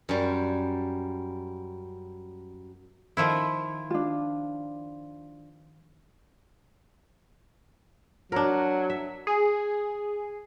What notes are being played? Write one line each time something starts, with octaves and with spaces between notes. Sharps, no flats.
F#2 G3
D#3 F3 E4
D4 F4
F#3 D4 A#4
E5
G#4